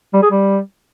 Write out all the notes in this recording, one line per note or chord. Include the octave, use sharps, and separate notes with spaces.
G3
G#4
G3